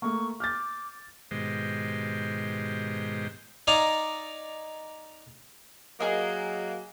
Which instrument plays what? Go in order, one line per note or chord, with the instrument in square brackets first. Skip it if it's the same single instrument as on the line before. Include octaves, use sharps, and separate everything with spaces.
[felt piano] A3 A#3 [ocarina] C#6
[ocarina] D6 [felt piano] F6 G6 A6
[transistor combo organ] G#2 B2 D#3 G#3 G4 C5
[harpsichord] D#4 D5 F5 G#5 A#5
[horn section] F#3 A#3 [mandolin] G#4 D#5